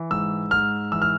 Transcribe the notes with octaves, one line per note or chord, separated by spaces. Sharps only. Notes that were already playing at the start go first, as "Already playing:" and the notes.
Already playing: E3
G#2 E6
G#2 F6
E3 E6
F6